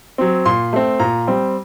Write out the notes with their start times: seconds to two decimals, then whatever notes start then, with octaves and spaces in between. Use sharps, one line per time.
0.18 F#3 C4
0.45 A#2 C6
0.73 A3 C4
0.99 A#2 A#5
1.27 G3 C4